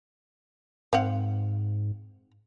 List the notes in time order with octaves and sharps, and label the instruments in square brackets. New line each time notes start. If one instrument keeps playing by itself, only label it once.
[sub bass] G#2 [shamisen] C4 F5 F#5